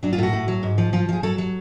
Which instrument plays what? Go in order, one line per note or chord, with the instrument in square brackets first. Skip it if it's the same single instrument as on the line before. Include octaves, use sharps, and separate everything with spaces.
[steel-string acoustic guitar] F#3 D4
F4
A2 F#4
A2
F#3
G#2
F3
F3 F4
F3 G#4
F#3 A4
F#3